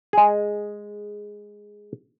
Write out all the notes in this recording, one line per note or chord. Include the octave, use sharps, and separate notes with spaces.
G#3 G#4